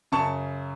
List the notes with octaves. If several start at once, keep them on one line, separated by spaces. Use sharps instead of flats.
F#2 C#3 A5 C#6